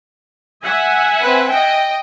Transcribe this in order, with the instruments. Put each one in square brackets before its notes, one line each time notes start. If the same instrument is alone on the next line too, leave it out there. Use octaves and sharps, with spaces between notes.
[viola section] E5 F#5 G#5
[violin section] C4 B4
D#5 G5